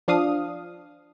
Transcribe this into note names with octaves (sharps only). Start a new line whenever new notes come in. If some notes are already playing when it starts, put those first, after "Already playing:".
F3 D4 F5 D#6